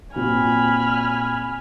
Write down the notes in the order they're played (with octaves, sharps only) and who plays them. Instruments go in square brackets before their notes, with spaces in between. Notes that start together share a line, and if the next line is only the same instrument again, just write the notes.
[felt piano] A#2 C4 F#4 [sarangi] G#5 [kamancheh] B5 F6